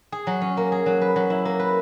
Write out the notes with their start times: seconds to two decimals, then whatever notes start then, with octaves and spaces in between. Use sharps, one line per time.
0.12 G#4
0.27 F#3
0.42 C#4
0.57 A#3
0.72 G#4
0.86 F#3
1.01 B4
1.16 F#3
1.30 E4
1.45 A#3
1.59 B4